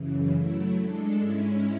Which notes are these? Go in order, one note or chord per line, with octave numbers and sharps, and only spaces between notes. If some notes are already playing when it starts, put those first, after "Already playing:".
Already playing: F#2 C#3 E3
F#3 A3 E4
G#3 D4 A4
G#2 G#3 C#4 E4